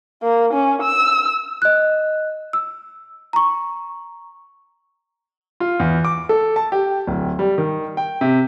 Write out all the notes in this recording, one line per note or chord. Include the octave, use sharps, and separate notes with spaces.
A#3
C#4
E6
D#5 F#6
E6
A#5 C#6
F4
E2
D6
A4
A5
G4
D1
G3
D#3
G5
C3